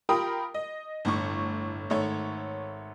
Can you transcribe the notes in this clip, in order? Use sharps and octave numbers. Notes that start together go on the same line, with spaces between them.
F4 G4 A#4 G5 B5 D#6
D#5
G1 A2 C#6
G#1 A3 C#5